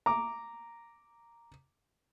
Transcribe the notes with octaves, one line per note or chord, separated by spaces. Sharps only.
A#5 D6